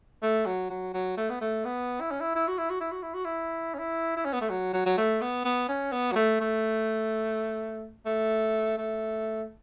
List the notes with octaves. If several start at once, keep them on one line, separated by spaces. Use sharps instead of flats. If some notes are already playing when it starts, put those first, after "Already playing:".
A3
F#3
F#3
F#3
A3
B3
A3
B3
E4
C#4
E4
E4
F#4
E4
F#4
E4
F#4
E4
F#4
E4
C#4
E4
E4
C#4
B3
A3
F#3
F#3
F#3
A3
B3
B3
C#4
B3
F#3
A3
A3
A3
A3